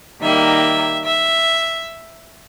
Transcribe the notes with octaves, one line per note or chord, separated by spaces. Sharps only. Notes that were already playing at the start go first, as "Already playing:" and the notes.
D#3 G3 A#3 E5
E5